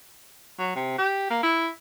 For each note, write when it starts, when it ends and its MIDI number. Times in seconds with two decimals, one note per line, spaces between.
0.59 0.75 54
0.75 0.93 48
0.98 1.28 67
1.30 1.39 58
1.43 1.69 64